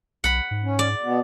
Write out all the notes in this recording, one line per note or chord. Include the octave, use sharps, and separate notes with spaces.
B1 F#5 B5
G#2
C#4
D5
B2 B3